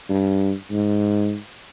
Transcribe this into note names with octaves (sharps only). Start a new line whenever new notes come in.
G2
G#2